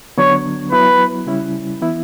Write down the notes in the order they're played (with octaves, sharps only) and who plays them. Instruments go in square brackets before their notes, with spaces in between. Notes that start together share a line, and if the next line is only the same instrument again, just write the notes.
[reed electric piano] D3 F#3 B3 D4 [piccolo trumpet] C#5
[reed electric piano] F#3 B3 E4 [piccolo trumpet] B4
[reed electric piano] C#3 G3 C#4 E4
E3 B3 E4